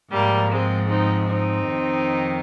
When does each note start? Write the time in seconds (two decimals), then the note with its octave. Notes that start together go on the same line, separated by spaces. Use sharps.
0.12 G#2 F3 G3 A#3
0.51 G#3 C4
0.89 C4 D#4
1.29 C4 D#4
1.67 F2 D#3